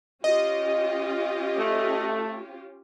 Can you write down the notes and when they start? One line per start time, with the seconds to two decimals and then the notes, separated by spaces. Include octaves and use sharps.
0.24 C#4 F4 G4 D#5
1.58 A3